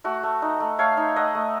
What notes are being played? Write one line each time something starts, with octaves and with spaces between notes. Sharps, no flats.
A3 F#4
A3
D#4
A3
A3 C#5 F5
D#4
A3 D#5 F#5
A3